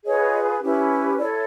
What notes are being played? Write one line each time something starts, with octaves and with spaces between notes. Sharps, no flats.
F4 G#4 B4 C#5 D#5
C#4 E4 G4 B4
E4 A4 C#5 D5